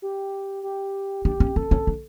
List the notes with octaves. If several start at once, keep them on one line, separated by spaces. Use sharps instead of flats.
G4
G4
D4 G4
C#4
C#4 A4
C#4
D4